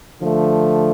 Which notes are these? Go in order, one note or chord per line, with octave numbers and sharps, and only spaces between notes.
D3 F3 A3